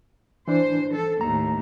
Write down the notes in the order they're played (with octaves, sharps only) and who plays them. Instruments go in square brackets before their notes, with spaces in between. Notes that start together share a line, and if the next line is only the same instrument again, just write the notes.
[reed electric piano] E3 D4 [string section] C5
[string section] A4
[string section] D#2 A2 [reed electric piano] A#5